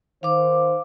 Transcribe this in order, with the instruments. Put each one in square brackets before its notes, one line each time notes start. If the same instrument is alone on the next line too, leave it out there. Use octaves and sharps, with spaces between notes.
[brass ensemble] D#3 C5 [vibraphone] F5 D6